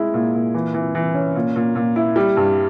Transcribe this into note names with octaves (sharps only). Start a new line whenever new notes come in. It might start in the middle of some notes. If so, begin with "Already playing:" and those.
Already playing: G#3 E4
A#2
A#2
E3
E3
E3
C#4
A#2
A#2
A#2
E4
G3
G2